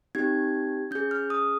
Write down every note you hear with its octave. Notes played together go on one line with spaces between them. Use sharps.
C4 D#4 G4 G#6
C#4 G#4 G6
F6
D#6